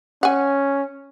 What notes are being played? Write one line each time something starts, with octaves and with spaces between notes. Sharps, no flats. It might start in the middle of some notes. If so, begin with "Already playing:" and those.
C#4 F#5 G#5